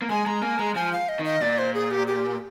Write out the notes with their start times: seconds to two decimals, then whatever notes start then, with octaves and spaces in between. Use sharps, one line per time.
0.02 A#3
0.10 G#3 G#5
0.26 G#3 A#5
0.42 A#3 G#5
0.59 G#3 A#5
0.75 F3 G#5
0.93 F5
1.09 D#5
1.19 D#3
1.25 D#5
1.42 A#2 D5
1.59 C5
1.74 G#4
1.91 G4
2.07 G4